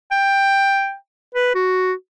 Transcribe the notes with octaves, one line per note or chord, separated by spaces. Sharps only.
G5
B4
F#4